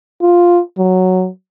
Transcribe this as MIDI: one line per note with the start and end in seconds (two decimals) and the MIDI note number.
0.22 0.61 65
0.78 1.29 54